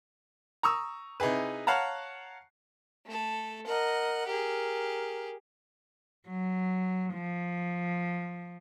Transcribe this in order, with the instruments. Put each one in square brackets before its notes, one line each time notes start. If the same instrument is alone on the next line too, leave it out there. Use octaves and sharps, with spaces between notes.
[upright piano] A#5 C#6 D#6 E6
C3 D#4 E4 G#4 B4
C#5 F5 F#5 A5 A#5
[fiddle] A3 A4
[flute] A#4 [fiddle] D#5 F#5
[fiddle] G4 G#4 [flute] A#4
[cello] F#3
F3